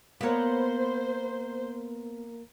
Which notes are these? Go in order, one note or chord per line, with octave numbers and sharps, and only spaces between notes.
A#3 B3 A#4 C5 C#5